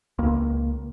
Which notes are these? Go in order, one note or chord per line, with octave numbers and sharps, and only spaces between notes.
C#2 A#3